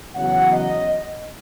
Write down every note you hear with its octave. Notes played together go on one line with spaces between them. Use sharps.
E2 C#3 F#3 F#5
D#5